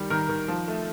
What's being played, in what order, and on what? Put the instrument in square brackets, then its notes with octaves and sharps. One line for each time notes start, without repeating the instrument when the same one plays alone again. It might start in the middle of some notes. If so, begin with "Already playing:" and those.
Already playing: [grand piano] D#3 G3
D#3 A#4
D#3
F3
A3